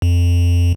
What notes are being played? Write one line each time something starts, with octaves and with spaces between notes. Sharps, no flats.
F2